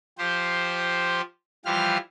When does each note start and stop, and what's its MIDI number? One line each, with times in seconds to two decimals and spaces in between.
0.18 1.21 53
0.18 1.21 67
0.18 1.21 72
1.65 1.97 52
1.65 1.97 53
1.65 1.97 55
1.65 1.97 65
1.65 1.97 67
1.65 1.97 89